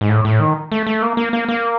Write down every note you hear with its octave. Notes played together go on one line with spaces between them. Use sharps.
G#2
A2
A2
D#3
A3
A3
A#3
A#3
A#3
A#3